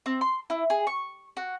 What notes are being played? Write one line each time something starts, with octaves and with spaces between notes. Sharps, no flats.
C4
C6
E4
G#4
C#6
F#4